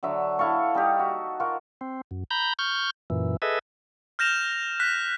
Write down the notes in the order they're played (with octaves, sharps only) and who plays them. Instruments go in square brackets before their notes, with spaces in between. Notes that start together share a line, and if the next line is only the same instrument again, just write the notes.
[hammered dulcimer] D3 F#3 E5
E4 A4 F5 C#6
G3 D#4 G4
F#4
F4 F#4 A#4
[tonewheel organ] C4
F#2
A#5 B5 G6
C#6 F6 G6
F#2 A#2 E3
G#4 A4 B4 D#5 E5
[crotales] F6 G6 A#6 E7 F7
F#6 B6